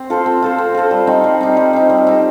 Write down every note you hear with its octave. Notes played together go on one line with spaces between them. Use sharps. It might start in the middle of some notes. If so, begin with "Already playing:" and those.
Already playing: C4
F4 A4 C5
C4
F4 A4 C5
C4
F4 A4 C5
G3
C4 D#4
G3
C4 D#4
G3
C4 D#4
G3
C4 D#4